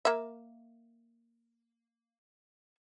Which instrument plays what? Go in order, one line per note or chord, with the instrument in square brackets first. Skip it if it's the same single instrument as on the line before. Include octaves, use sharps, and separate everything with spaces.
[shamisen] A#3 E5